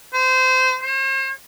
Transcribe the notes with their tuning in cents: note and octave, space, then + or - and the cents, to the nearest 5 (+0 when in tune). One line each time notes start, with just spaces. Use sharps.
C5 -25
C5 +45